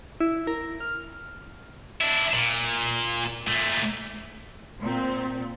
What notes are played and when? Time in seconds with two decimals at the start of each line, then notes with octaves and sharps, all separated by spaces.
0.20 E4
0.47 A#4
0.80 F6
2.01 D4 E4
2.34 A#2
3.47 A#2 A3
4.80 A#2 C4